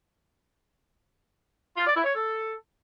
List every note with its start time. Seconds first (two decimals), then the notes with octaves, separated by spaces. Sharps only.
1.77 F4
1.86 D5
1.95 E4
2.04 C#5
2.13 A4